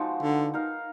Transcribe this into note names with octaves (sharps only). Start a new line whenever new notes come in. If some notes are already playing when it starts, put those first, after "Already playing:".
Already playing: F3 G#3 B3 D#4 F#4
D3
D#4 A#4 F5